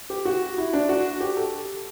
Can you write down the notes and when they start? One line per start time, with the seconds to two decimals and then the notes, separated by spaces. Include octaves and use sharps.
0.10 G4
0.25 F#4
0.58 E4
0.73 D4
0.89 F#4
1.21 G4
1.37 A4